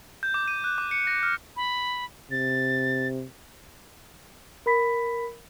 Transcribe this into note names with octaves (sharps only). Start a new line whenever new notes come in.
G6
D6
D#7
F#6
D6
C#7
A#6
F6
B5
C3 A6
A#4 B5 B6